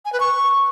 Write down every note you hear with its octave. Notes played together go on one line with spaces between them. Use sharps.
G#5
B4
C#6